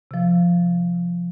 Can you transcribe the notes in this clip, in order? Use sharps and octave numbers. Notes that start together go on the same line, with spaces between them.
C3 F3